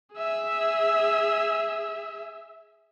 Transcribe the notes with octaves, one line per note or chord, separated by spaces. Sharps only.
G#4 E5